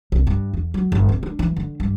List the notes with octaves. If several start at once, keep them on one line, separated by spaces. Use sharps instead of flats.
C2
G2
E2
F#3
G1
C3
D4
E3
D3
G2